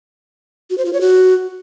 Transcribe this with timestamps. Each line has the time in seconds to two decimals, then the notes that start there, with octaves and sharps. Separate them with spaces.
0.70 F#4
0.78 C5
0.85 F4
0.93 C#5
1.01 F#4